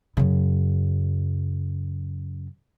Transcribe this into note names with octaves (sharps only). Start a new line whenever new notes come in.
F#2 C#3